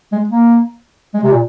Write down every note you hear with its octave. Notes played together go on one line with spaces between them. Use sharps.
G#3
A#3
G#3
C3
A#2